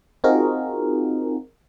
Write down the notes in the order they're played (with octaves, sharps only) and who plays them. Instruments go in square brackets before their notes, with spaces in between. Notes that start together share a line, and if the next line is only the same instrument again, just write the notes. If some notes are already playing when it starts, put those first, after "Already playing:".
[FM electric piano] C4 D#4 F4 F#4 G#4 A#4